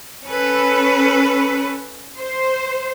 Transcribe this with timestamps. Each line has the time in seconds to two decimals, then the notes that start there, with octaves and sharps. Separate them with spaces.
0.23 C#4 A4 B4
2.17 C5